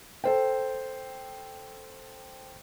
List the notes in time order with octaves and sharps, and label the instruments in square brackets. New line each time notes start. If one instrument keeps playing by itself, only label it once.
[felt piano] A4 C5 G5